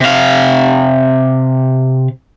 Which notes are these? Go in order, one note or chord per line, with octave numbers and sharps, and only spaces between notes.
C3 F5